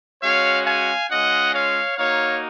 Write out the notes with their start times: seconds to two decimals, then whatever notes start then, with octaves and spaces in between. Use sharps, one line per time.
0.21 G#3 C#4 F#4 C#5 F5
0.66 F5 G#5
1.10 G#3 C#4 F4 D#5 F#5
1.54 C#5 F5
1.98 A#3 D#4 F#4 C#5 F5